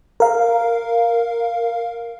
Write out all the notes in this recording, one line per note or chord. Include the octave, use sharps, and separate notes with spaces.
A#4 F5